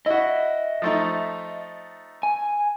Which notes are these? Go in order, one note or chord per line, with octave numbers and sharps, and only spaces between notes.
E4 F#4 D#5 E5
F3 A3 D#4
G#5